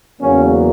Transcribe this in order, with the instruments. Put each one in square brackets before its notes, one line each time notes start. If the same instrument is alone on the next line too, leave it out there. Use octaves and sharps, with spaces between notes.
[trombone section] E2 C#3 F#3 A#3 C#4